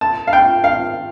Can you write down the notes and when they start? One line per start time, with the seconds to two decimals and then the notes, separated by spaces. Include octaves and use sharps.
0.01 A5
0.27 F5
0.33 G5
0.64 F5